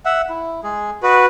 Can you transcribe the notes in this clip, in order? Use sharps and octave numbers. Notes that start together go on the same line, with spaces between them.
E5 F#5
E4
G#3 G#4
F#4 B4 D#5